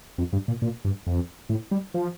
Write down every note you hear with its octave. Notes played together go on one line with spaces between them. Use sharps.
F2
G2
A#2
A#2
G2
F2
A2
G3
F3